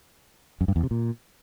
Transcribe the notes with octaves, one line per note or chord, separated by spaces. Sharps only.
F#2
G2
E2
C3
A#2